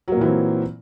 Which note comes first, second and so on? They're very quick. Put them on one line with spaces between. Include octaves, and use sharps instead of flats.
F#3 A#3 A#2 E3 C4